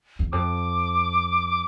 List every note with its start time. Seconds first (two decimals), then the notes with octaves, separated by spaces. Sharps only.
0.19 E2
0.32 F2 D6